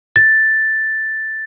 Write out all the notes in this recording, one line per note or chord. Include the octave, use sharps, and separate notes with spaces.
A6